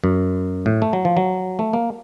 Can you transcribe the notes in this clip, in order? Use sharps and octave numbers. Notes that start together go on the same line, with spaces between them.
F#2
A2
A3
F#3
F3
F#3
A3
A#3